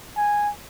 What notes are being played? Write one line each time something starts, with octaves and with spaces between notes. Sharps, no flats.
G#5